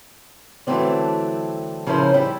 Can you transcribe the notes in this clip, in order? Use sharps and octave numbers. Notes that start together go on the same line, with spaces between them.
D3 E3 F#3 A3 C4 D4
C#3 F3 C#4 E4 A#4 C5
G3 E4